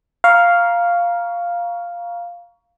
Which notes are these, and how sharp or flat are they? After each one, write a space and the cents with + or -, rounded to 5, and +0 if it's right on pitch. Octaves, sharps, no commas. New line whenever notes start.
F5 +0 A#5 +15 C#6 +20